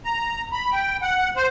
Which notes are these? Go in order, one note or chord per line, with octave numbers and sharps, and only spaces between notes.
A#5
B5
G5
F#5
C5